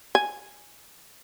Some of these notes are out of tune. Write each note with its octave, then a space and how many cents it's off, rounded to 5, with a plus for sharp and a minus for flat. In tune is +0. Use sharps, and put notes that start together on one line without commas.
G#5 -5